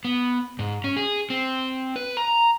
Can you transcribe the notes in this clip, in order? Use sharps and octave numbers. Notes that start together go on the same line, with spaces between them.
B3
G#2
C#4
G#4
C4
B4
A#5